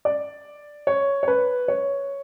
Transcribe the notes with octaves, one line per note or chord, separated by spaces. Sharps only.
D5
C#5
C#5
B4
C#5